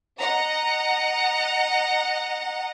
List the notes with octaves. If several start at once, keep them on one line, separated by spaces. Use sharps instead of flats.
D#5 F#5 A#5